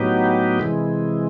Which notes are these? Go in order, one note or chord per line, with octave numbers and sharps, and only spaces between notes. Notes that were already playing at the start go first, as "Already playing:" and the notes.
Already playing: A2 F#3 B3 D#4 G4
C3 E3 G#3